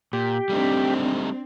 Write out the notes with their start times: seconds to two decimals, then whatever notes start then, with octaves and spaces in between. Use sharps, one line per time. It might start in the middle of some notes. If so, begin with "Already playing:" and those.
0.13 A#2 G4
0.49 G3 A3 C4 D4 D#4